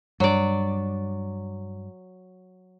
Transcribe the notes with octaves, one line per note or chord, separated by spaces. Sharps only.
G2 F#3 D5